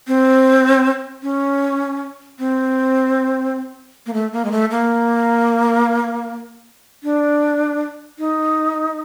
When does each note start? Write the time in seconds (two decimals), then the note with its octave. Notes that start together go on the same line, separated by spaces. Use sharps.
0.08 C4
1.23 C#4
2.39 C4
4.06 A#3
4.14 A3
4.33 A#3
4.45 G#3
4.52 A3
4.71 A#3
7.03 D4
8.19 D#4